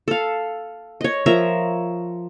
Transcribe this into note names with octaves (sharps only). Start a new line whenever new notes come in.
A4 F5
C#5 D#5
F3 A#4 E5 A#5